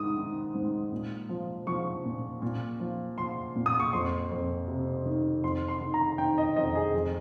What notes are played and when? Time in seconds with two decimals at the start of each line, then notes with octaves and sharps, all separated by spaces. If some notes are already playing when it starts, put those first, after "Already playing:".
Already playing: G#2 D#3 D#6
0.17 D#3
0.54 G#2
0.92 A#2
1.29 F3
1.67 F3 C#6
2.05 A#2
2.42 A#2
2.80 F3
3.18 F3 C6
3.55 A#2
3.66 D#6
3.80 C#6
3.93 F2 C6
4.31 F2
4.68 C3
5.06 D#3
5.43 F2 C6
5.68 C6
5.81 D#3
5.94 A#5
6.18 D#3 G5
6.38 D#5
6.56 F2 D#5
6.75 G#4
6.94 F2